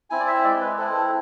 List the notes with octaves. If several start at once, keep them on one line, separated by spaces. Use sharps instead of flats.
C4 E4 G#5
D5
E5
G#3 D5
B4
C4 E4 A4
A4